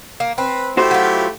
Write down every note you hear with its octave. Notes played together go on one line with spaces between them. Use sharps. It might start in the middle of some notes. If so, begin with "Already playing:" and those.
A#3
C4 B4
A3 E4 F#4 G4 C5
F#3 F4